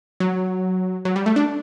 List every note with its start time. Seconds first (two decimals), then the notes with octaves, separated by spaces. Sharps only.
0.20 F#3
1.05 F#3
1.16 G3
1.26 A3
1.36 D4